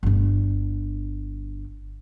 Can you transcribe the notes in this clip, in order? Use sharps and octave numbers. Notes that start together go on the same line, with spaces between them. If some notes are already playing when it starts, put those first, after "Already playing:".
G1 D4